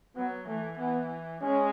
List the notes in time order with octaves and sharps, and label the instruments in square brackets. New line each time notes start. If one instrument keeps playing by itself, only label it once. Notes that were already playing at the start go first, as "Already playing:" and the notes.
[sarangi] F#3 [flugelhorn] B3
[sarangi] E3 [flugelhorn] A3
[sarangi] E3 [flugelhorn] B3
[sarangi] G#3 [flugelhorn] C#4